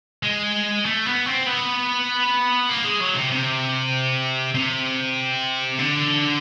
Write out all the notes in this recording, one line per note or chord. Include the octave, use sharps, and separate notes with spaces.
G#3
A3
B3
C4
B3
A#3
G#3
F#3
C3
C3
C3
D3